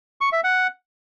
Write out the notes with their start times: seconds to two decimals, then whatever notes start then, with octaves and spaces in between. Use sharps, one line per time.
0.21 C#6
0.32 E5
0.44 F#5